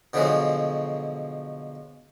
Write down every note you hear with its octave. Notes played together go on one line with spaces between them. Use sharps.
B2 D3 F3 F#3 G#3 A3